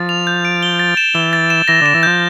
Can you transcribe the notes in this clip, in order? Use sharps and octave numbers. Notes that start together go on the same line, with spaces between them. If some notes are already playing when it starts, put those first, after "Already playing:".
Already playing: F3 A6
F7
G6
D7
G7
A6
E7
E3 G7
A6
E7
E3 A#6
D3 E7
E3
F3 G6